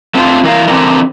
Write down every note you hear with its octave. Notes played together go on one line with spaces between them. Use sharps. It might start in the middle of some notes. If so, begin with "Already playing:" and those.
A3 C4 D4 D#4 F4
E3 A#4 F5
D3 E3 C4 D4 E4 A#4